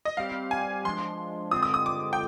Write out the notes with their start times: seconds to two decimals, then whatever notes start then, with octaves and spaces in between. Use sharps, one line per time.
0.05 D#5
0.17 G3 C4 G4 F5
0.51 G#5
0.85 F3 G#3 D4 C6
1.51 D3 G#3 C4 F4 D#6
1.63 D#6
1.74 D#6
1.86 D6
2.13 G5